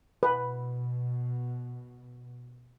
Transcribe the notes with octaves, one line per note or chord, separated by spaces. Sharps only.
B2 B4